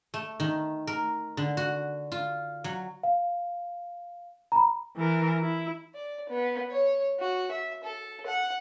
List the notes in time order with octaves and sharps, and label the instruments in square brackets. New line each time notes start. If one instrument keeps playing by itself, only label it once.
[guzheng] A3
D#3
A#4
D3
F#4
F4
F#3
[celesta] F5
A#5 B5
[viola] E3 A#4
E4
[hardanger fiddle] D5
B3
C#5
F#4
E5
A4
F#5